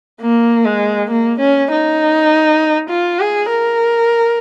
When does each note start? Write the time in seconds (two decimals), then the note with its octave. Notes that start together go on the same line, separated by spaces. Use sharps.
0.21 A#3
0.65 G#3
1.11 A#3
1.40 C#4
1.71 D#4
2.90 F4
3.20 G#4
3.49 A#4